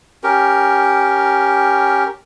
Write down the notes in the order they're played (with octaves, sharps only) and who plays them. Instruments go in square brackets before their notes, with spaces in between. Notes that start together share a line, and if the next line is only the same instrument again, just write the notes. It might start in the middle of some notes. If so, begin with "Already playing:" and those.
[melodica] C#4 G4 A#4